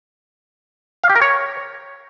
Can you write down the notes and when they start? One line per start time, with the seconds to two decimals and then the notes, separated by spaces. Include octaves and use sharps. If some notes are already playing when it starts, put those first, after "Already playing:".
1.04 F5
1.10 G4
1.16 A#4
1.22 C#5